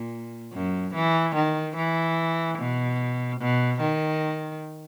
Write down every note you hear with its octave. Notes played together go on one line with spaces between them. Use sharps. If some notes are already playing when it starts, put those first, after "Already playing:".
Already playing: A#2
F#2
E3
D#3
E3
B2
B2
D#3